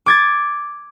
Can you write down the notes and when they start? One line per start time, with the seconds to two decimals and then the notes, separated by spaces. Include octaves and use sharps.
0.06 D6 G#6 A6